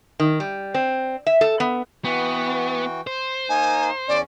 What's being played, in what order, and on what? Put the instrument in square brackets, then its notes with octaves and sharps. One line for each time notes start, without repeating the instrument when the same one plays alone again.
[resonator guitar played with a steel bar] D#3
G3
C4
E5
A4
B3
[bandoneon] E3 F#4 G5 [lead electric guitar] B3
[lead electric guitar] C5
[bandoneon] A#3 D#4 [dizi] G#5
[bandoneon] E2 C#4 [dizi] D5